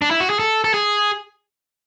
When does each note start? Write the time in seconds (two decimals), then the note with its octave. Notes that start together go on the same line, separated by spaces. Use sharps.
0.02 D4
0.11 E4
0.20 F#4
0.30 G#4
0.39 A4
0.64 A4
0.74 G#4